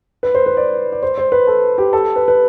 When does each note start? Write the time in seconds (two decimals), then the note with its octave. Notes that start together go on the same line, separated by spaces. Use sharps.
0.23 B4
0.35 C5
0.46 B4
0.57 D5
0.92 D5
1.03 C5
1.18 C5
1.32 B4
1.47 A4
1.78 G4
1.93 A4
2.16 B4
2.28 B4